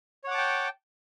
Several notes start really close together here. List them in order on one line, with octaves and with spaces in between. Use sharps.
C#5 F#5 D6 A5 G5